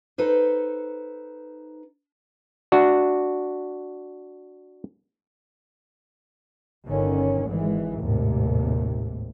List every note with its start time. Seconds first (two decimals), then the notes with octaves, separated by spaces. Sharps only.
0.18 D#4 A4 B4 C5
2.72 D4 F#4
6.87 G1 D3 D#3 C#4
7.44 G#1 E3 G#3
8.00 G#1 D#2 A2 C3